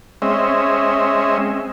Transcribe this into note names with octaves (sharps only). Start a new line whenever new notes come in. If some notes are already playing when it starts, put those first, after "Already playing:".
G#3 C4 C#4 D#5 E5